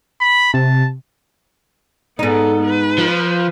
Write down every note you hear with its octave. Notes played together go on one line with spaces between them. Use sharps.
B5
C3 A5
G#2 B3 D#4 A4
B4
F3